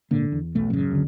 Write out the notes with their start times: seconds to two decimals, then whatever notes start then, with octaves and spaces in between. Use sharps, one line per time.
0.11 G#1 A#2 D3 A#3
0.32 E2
0.55 B1 B2 A3
0.70 A1 F#2 C#3
0.91 D2 D3